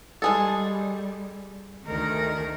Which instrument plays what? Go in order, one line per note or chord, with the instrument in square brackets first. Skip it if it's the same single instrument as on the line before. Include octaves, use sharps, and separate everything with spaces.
[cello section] G3 [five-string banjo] G#3 G#4 A4
[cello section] D2 A3 D#4 [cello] D#3 A#4